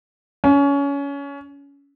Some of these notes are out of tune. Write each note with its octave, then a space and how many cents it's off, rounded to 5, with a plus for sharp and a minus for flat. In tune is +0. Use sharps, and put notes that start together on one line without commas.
C#4 +25